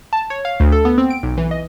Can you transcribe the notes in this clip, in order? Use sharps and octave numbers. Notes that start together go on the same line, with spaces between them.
A5
C#5
F5
D2
A4
B3
C4
D7
B1
E3
D#5